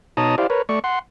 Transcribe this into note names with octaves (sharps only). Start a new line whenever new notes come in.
B2 D#4 C#5 A5 A#5 D#6
E4 G4 C5 D5 F5
A#4 B4 C#5
A3 D5 C#6
F#5 C6